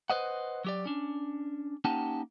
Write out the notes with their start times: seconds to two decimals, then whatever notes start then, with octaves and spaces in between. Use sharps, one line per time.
0.10 B4 C5 D#5 F#5
0.64 F#3 G4 D5
0.86 C#4 D4
1.84 A#3 C#4 D#4 G4 F#5 A5